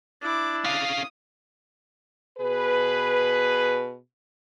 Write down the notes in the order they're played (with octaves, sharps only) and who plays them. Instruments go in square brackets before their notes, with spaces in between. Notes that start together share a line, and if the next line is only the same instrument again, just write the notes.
[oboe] D4 [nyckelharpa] E4 D6
[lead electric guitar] C#4 F5 [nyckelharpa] D#6
[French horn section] B2 G#4 B4